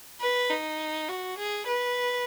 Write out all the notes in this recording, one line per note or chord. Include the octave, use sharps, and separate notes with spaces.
B4
D#4
F#4
G#4
B4